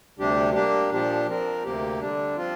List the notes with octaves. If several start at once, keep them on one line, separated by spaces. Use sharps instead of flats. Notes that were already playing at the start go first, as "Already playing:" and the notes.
D2 C3 G3 D4 G4
G3 A#3 D4 G4
A#2 F3 D4 G4
F3 C4 A#4
D2 C3 A#3 G4
D3 G3 D4
F3 C4 F4